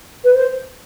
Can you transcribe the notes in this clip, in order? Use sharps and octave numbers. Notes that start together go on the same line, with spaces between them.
B4
C5